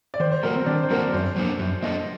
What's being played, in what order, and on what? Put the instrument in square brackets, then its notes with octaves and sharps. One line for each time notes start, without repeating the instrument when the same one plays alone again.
[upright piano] D5
[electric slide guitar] D#3 [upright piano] C5
[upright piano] C5
[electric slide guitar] G3 A#3 F#4 A4 [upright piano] A#4
[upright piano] C4
[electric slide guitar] D#3 [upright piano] D4
[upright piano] C5
[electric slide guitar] G3 A#3 F#4 A4 [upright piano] A#4
[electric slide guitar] F#2 [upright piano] C5
[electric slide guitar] F#3 A#3 D4 A4
F#2
[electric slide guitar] F#3 A#3 D4 A4 [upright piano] D#5